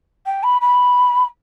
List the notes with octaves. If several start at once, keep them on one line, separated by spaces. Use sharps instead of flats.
G5
B5
B5